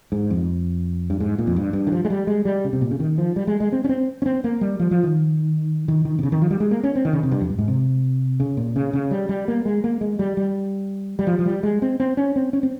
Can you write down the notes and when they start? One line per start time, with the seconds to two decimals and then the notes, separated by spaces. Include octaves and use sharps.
0.12 G#2
0.30 F2
1.10 G2
1.20 G#2
1.38 A#2
1.47 F2
1.56 G2
1.73 G2
1.87 D#3
1.92 F3
2.05 G#3
2.10 G3
2.27 G#3
2.45 G3
2.64 C#3
2.73 C3
2.81 A#2
2.91 C#3
3.00 D#3
3.18 F3
3.36 G3
3.47 G#3
3.60 G#3
3.72 C4
3.84 C#4
3.89 C4
4.22 C#4
4.26 C4
4.44 A#3
4.61 G3
4.80 F3
4.91 F3
5.03 D#3
5.88 D#3
6.05 D#3
6.19 C3
6.23 C#3
6.32 D#3
6.42 F3
6.50 G3
6.60 G#3
6.71 A#3
6.83 C#4
6.95 C4
7.05 D#3
7.13 C#3
7.23 C3
7.31 G2
7.41 F2
7.50 G2
7.58 G#2
7.68 C3
8.40 C#3
8.57 A#2
8.76 C#3
8.93 C#3
9.11 G3
9.29 G3
9.48 A#3
9.65 G#3
9.84 A#3
10.01 G#3
10.19 G3
10.37 G3
11.19 G3
11.27 F3
11.39 F3
11.46 G3
11.63 G#3
11.82 C4
12.00 C4
12.17 C#4
12.36 C4
12.53 C#4
12.63 C4